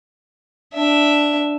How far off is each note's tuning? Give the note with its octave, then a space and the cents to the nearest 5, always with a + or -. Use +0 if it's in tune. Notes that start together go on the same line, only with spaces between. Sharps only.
D4 +0 E5 +0